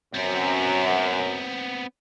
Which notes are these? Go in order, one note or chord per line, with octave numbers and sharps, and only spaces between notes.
F#2 B3 C4